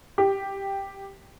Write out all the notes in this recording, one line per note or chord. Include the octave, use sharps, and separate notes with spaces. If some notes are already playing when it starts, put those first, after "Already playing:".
G4